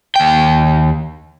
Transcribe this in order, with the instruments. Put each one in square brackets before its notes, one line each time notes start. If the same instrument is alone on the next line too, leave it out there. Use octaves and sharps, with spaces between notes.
[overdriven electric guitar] D#2 G5